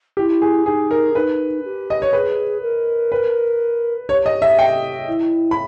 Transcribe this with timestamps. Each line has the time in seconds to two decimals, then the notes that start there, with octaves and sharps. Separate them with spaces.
0.17 E4 G4
0.42 G#4
0.66 D#4 G#4
0.91 A#4
1.15 D#4 B4
1.64 G4
1.90 D#5
2.02 C#5
2.13 G#4 B4
2.62 A#4
3.12 B4
4.09 G4 C#5
4.26 D#5
4.42 E5
4.59 G5
5.07 E4
5.51 B5